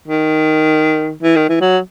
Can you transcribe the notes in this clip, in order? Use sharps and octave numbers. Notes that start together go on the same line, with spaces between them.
D#3
E3
D#3
E3
F#3